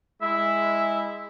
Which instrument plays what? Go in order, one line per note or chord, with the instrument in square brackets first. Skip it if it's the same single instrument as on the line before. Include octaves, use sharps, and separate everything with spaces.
[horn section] G#3 E4 [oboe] E5